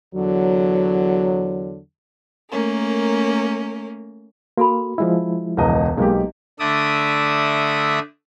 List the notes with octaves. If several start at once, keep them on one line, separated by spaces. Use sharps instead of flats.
E2 D3 F#3
A3 A#3 C#4 A#4
A#3 F#4 A4 B5
F3 G#3 E4
E1 C#2 B4 D#5 A5 A#5
B1 G#3 A#3 G4
D3 A3 D5 E5 D#6